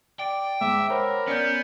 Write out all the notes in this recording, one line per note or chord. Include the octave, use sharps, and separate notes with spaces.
D5 G5
G#2 E5 D6
A#4 C5 C#5 F#5 B5
B3 C#4 D5 G6